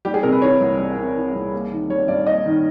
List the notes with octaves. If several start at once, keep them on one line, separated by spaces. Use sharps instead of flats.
G3 G4
G#4
C3 A#4
B4
E3 C#5
C2
G3
C3
E3
C2
A#3
D#3
G3 C#5
G2 D5
A#3 D#5
D#3